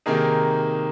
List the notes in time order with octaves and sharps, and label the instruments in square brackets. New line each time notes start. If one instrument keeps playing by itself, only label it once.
[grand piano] C3 D#3 A#3 D#4 G#4